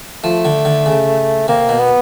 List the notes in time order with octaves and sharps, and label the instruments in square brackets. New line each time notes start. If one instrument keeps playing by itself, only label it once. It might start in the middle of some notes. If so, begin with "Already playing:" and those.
[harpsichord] F3 [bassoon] A3
[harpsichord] D3
D3
C#3
[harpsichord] C3 [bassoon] A#3
[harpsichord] B2
[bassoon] B3